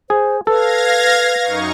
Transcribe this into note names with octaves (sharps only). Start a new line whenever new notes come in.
G#4 C5
A4 B4 F5 G#6 A#6
F#2 D#4 C#6